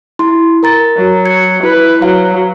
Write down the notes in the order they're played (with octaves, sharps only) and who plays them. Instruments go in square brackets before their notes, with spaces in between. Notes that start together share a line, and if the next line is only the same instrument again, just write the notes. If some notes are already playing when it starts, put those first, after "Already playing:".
[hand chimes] E4 C6
A#4 A#5 A6
[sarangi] F#3
[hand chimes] G#6 C#7
[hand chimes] E4 [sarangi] B4
[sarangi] F#3 [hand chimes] F5